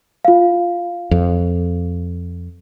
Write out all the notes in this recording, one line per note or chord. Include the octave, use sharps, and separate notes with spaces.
F4 F5
F2